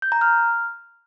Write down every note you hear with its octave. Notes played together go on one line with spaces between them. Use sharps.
G6
A#5
F6